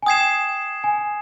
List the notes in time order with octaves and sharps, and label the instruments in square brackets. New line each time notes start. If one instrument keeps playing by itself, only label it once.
[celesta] G#5
[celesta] G5 [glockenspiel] D#6 G#6 C7 E7
[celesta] G#5